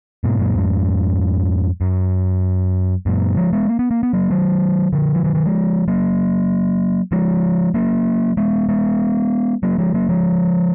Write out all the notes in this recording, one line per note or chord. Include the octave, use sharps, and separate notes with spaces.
G#2 B2
F#2 A#2
F2 G#2
F#2
F#2 A#2
F3 G#3
G#3 B3
A#3
B3
A#3
B3
F#3 A#3
D#3 F#3
D3 F3
F3
D#3 F#3
D#3 F#3
F3 G#3
F#3 A#3
F3 G#3
F#3 A#3
G#3 B3
G#3 B3
F#3 A#3
F3 G#3
F#3 A#3
F3 G#3